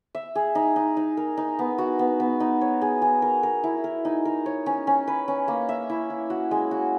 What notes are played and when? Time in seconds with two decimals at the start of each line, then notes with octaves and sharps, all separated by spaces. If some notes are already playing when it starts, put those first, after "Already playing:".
0.15 E5
0.35 G#4
0.55 D#4
0.76 D#4
0.97 D#4
1.17 A#4
1.37 D#4
1.59 B3
1.78 F#4
1.99 B3
2.20 B3
2.40 D#4
2.61 C#5
2.82 G#4
3.02 G#4
3.22 A#4
3.43 A#4
3.64 E4
3.84 A#4
4.05 D#4
4.25 A#4
4.46 C#5
4.66 C#4
4.87 C#4
5.07 B4
5.28 C#4
5.48 A#3
5.69 E5
5.90 E4
6.10 E4
6.30 F#4
6.51 G#3
6.71 F#4